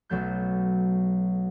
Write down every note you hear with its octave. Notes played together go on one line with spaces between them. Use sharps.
B1 F#3 A3 G6